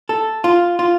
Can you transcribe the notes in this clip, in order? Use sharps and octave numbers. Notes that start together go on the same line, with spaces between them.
A4
F4
F4